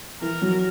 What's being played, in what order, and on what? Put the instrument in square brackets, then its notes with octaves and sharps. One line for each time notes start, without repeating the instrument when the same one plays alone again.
[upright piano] E3 [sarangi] A#4
[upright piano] F#3